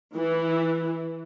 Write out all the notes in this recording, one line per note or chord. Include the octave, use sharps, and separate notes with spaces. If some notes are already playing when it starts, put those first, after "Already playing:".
E3